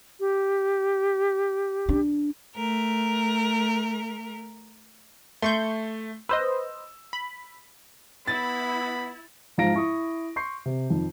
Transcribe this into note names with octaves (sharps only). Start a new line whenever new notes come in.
G4
D4
A3 A#4
A3 C6 C#6 G6
B4 C5 D#5 E6
B5
B3 E4 B5 A6
G#2 F3 F5 A#5 A#6 D7
E4 C#6 D#6
C6 C#6 G6 C7
C3
F2 D#3